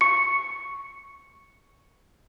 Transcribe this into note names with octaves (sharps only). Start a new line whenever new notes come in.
C#6 C#7